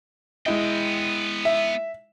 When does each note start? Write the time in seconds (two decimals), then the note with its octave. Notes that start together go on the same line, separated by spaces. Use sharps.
0.46 G#3 B3 E4 D#5 G5
1.45 E5